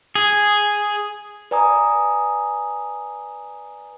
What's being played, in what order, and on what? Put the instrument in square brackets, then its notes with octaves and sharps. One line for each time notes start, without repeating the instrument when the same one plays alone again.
[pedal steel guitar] G#4
[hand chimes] B4 D5 G#5 A#5 D#6